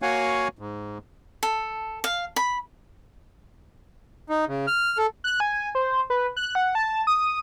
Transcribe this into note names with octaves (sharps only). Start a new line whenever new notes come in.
A#3 F#4 C#5 F5 F#5 G#5
G#2
A4
F5
B5
D#4
C#3
F6
A4
F#6
G#5
C5
B4
F#6
F#5
A5
D#6